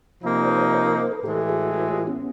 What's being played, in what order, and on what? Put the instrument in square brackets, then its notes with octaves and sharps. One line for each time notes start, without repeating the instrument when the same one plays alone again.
[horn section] C3 F3 A#3 D#4
[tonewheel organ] C5 D5
B4 C#5
C5 D5
B4 C#5
A#4 C5
A#4 C5
A4 B4
[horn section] A2 E3 G#3 [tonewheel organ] G4 A4
[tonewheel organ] F#4 G#4
F#4 G#4
F4 G4
B3 C#4